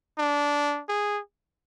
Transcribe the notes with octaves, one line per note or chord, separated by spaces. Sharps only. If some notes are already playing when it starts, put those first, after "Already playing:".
D4
G#4